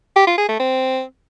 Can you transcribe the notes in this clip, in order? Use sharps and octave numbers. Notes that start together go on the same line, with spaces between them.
G4
F4
G#4
A3
C4